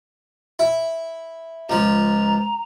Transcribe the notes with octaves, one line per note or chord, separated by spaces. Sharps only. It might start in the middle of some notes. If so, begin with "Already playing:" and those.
E4
C#2 F3 A#5